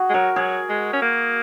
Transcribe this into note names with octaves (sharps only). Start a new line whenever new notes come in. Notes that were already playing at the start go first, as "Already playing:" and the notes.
Already playing: F#4 G#4
G#3
F#3 A#4
F#3 G#4
G#3
C#4
A#3